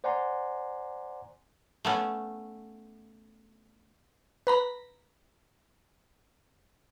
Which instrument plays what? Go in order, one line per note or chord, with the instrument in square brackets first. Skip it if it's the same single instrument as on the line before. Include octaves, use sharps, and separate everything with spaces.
[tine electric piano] C5 D5 F#5 G#5 A#5 C6
[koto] A3 B3 C#4
[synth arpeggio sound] B4 A#5 B5